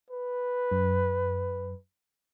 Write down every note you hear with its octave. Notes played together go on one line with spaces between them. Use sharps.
B4
F#2